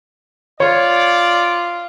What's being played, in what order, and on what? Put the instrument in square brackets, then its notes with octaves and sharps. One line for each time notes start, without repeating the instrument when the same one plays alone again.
[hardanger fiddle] F4 [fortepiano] C#5 [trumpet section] D5